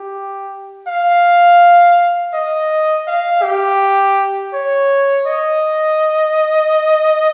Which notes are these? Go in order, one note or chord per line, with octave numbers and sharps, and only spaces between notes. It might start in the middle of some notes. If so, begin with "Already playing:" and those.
Already playing: G4
F5
D#5
F5
G4
C#5
D#5